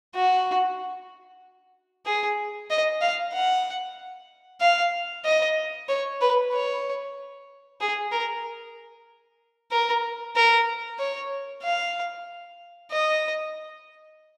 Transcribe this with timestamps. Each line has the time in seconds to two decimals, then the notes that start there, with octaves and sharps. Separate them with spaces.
0.15 F#4
2.06 G#4
2.71 D#5
3.01 F5
3.33 F#5
4.61 F5
5.25 D#5
5.89 C#5
6.21 B4
6.53 C#5
7.81 G#4
8.12 A#4
9.71 A#4
10.36 A#4
10.99 C#5
11.63 F5
12.92 D#5